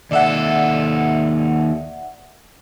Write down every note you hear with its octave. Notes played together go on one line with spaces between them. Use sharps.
D#2 A4 D5 E5 F#5